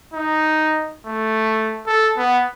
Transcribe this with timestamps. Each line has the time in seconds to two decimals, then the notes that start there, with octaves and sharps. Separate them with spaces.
0.14 D#4
1.06 A3
1.87 A4
2.17 B3